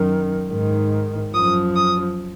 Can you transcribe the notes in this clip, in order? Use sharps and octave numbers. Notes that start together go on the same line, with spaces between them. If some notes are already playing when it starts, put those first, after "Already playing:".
Already playing: F#2 D#3
G#2 D#3
F#2 F3 D#6
D#6